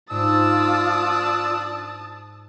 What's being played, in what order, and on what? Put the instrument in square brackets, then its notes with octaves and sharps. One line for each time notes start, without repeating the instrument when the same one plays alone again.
[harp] G#2 [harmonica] D4 E6 [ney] F4 [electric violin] A5 D#6